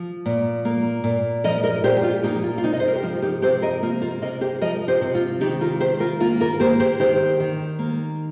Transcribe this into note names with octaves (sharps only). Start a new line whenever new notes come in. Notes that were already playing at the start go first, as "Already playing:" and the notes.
Already playing: F3
A#2
A#3
A#2
F3 A#4 D#5
A#4 D#5
A#2 G4 C5
G4
F4
A#3 D#4 G4
F4
F4
C3 D#4
D#5
C5
A#4
G4
F3 F4
D#4 G4
C3 G4 C5
A#4 D#5
A#3 F4
F4 A#4
C3 A#4 D#5
G4 C5
F3 A#4 D#5
G4 C5
C3
F4
D#3 D#4 G4
F4 A#4
D#3 G4 C5
F4 A#4
A#3 F4
F4 A#4
A#3 G4 C5
G4 C5
D#3 G4 C5
D#3
A#3